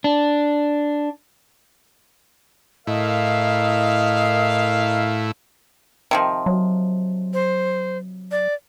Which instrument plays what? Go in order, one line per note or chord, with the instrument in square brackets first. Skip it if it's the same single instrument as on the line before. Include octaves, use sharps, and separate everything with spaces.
[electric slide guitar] D4
[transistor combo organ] A2 E4 [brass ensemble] A#4 F5 [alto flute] D#5
[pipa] C3 D#3 F3
[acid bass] F#3
[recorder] C5
D5